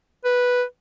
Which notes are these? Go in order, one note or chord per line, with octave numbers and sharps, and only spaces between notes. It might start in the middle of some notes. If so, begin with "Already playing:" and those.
B4